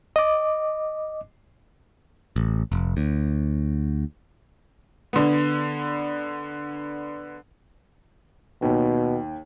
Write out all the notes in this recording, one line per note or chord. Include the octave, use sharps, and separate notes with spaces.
D#5 D6
A1
F1
D2
D3 B3
D#2 B2